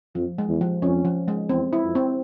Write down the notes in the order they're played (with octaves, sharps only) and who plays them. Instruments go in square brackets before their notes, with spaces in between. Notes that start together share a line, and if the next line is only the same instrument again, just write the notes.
[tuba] F2 [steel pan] F3
[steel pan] G#3
[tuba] E2
[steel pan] F3
[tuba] F2 [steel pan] C#4
[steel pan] F3
G#3
[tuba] E2 [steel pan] C4
[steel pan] E4
[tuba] F2
[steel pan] C4